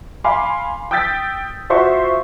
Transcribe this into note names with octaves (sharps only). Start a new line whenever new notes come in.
F5 G#5 B5 C6 D6
G5 D#6 E6 G6 A6 B6
F4 F#4 C5 E5 C6 C#6